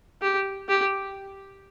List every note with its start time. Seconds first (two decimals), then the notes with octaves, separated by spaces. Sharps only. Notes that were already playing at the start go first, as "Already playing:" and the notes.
0.22 G4
0.69 G4